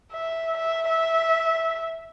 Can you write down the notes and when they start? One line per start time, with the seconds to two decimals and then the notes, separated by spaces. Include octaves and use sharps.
0.12 E5
0.57 E5
0.89 E5